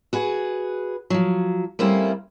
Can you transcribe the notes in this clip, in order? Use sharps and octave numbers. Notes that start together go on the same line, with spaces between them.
F#4 G#4 B4
F3 F#3
G3 A3 A#3 C4 C#4 E4